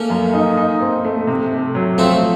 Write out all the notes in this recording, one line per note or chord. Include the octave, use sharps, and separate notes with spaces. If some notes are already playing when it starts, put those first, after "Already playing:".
Already playing: A3 A#3 C#4
F#2
D#4
D#4
C4
A3
C3
A3
F#3
F3 A3 C4